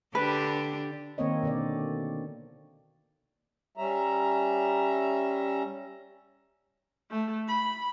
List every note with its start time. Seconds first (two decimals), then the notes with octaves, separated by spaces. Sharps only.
0.15 D3 D4 G4 B4
1.18 D#3 A#3 C4 C#5 D#5
1.43 B2 D3 D5
3.77 G3 C#4 E5 A#5
7.11 A3
7.48 B5